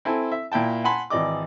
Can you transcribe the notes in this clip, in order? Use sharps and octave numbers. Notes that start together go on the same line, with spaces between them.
C4 E4 A4 G#5
E5
A#2 E4 G5 A5
F#5 G#5 A5 B5 C6
G#1 E3 D5 D#5 D6